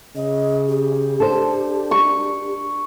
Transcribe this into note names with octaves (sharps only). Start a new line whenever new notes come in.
C#3 D#5
G4
D4 A4 C5
C#6